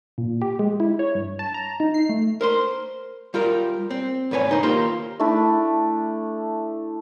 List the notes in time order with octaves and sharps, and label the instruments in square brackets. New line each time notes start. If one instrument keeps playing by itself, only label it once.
[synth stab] A#2
G4
G#3
E4
C#5
G2
A5
A#5
D#4
C7
A3
[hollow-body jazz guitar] A#4 C5 C6
G3 F4 G4 A#4
C4
E2 G#2 B4 C#5 G#5
C#2 D#4 C5
D#2 A#3 F4 G4 A#5 C6
[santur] A3 D4 E4